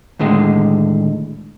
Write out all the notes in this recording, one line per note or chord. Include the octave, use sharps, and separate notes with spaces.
D#2 A2 D3 G#3